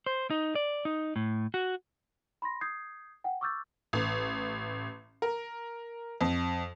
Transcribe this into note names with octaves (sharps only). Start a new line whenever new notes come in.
C5
D#4
D5
D#4
A2
F#4
B5 C6 A#6
D#6 G6 G#6 C7
F#5 G5
C#6 D6 E6 F6 G6 A6
A1
A#4
F2